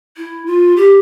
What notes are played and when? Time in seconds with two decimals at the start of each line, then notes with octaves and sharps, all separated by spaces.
0.17 E4
0.46 F4
0.77 G4